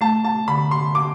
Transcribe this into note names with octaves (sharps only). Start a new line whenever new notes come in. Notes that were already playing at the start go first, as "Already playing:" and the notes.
A3 A5
A5
D3 B5
C6
D6